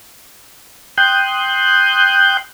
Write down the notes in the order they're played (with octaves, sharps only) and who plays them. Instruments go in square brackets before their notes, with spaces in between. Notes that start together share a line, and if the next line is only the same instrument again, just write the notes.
[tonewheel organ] G5 C6 D#6 F#6 G6